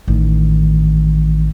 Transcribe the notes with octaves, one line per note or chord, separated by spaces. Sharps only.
A1 D#3